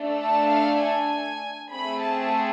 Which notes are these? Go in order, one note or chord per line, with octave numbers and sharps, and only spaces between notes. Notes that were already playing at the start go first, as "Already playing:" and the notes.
Already playing: A3 D4 A4
A5
F5
G#5
A3 C4 G#4 B5
A5